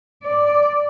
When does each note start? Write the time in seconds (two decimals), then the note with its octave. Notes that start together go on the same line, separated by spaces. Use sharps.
0.23 D5